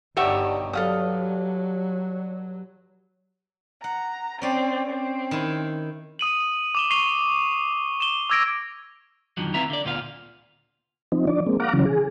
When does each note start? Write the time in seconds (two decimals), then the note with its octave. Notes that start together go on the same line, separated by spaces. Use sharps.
0.17 G1 G2 D#4 F#4 G4 C#5 D5 E5
0.73 F#3 A4 F5 D#6
3.84 F#5 A#5
4.42 C4 C#4 D5
4.90 C4
5.31 D#3 E4
6.19 D#6 D#7 F#7
6.75 D6 E7 G7
6.91 C#6 C7 D#7 F7 G7
8.00 E7 G7
8.30 D6 E6 G#6 A#6 D7
9.37 F2 D3 D#3 F3 F#3
9.54 A#3 C4 E4 B4 E5 A#5
9.70 D3 D5
9.85 D2 A#2 B3 F4 F#4 F5
11.12 F3 C4 D#4
11.27 F3 D4 D5
11.46 G#3 A#3 C4
11.60 F5 F#5 A#5 D6
11.73 C#3 E3 F#3 C#4
11.85 G#4